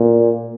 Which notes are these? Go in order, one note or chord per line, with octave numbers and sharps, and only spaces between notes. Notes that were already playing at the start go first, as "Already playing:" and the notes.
Already playing: A#2